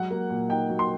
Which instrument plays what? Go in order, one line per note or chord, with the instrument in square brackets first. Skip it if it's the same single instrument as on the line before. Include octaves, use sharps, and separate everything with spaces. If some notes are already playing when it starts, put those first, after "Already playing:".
Already playing: [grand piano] F#3 G#3 [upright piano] F#5
[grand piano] A#3
A#2
[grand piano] D#4 [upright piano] G5
[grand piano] F#3
[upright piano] C6